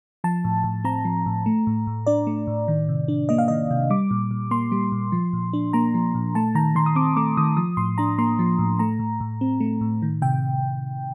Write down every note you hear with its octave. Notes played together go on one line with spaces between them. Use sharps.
F3 A5
A2
A2
C4 A#5
F3
A2
A3
A2
A2
D4 D5
A3
A2
D#3
C3
D4
A#3 D#5
F5
D#3 D#5
C3
G3 D6
A#2
A#2
A#3 C6
G3
A#2
F3
A#2
D4
A#3 A#5
F3
A#2
A3 A5
D#3 A#5
D#3 C6
D#6
C4 D6
A3 D6
D#3 D#6
F3 D#6
A2 C6
D4 A#5
A#3 C6
F3
A2
A3 A#5
A2
A2
C4
A3
A2
D#3
C3 G5